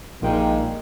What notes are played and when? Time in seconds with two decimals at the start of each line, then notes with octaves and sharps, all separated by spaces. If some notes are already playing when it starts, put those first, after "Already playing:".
0.21 A#1 D#3 G3 G#3 A#3 F4 G5